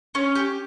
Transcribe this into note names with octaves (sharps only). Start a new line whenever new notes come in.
C#4
G4